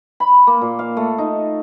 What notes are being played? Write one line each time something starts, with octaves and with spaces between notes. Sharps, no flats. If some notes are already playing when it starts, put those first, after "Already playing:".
B5
A#3
A#2
F5
A3
D#4